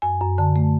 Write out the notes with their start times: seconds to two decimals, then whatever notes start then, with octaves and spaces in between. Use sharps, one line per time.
0.02 F#2 G#5
0.21 F#2
0.38 D3 A5
0.56 A3